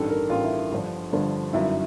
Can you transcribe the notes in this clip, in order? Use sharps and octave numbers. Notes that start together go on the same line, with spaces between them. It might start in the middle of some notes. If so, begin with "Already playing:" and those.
Already playing: A1 G2 D#3 A4
A#4
A1 G2 D#3 F4
E4
G1 G2 D3 F3
G1 G2 D3 F3
G1 F#2 D#3 E4